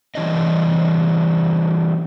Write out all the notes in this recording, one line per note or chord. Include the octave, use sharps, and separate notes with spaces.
E3 G3 C#4 D4 D#5